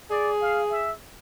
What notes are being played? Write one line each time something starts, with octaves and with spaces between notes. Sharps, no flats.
G#4 D5
F5
E5